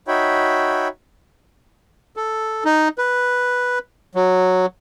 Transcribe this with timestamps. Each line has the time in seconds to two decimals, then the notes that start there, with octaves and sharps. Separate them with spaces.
0.08 D#4 F#4 C#5 E5 G5 B5
2.16 A4
2.65 D#4
2.98 B4
4.15 F#3